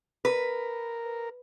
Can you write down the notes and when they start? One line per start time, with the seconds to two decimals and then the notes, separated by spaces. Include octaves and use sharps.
0.25 A#4 B4